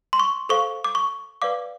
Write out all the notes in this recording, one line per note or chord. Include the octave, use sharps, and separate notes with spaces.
C6
C#6
A4 C5 F5 C#6
D6
C#6
B4 D5 F5 D6